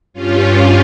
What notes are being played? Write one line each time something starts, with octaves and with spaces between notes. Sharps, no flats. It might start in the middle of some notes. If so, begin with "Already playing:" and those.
G2 G3 C#4 F4